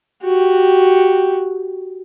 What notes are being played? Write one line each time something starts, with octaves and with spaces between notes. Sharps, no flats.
F#4 G4